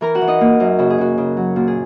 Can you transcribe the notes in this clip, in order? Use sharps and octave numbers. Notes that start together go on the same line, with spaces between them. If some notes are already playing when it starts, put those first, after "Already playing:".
E3 A#4 A#5
F#4 F#5
E3
D#4 D#5
A#3
F#2
C#3 F#4
G#4
C#3 F#4
C#3
F#3
A#2 F#4
G#4